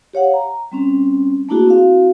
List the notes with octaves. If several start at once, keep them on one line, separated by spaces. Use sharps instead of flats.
G4 C#5 F5 F#5
A#5
G3 C4 C#4
A3 A#3 D4 E4 F#4 G#4
C4 E4 F#4 F5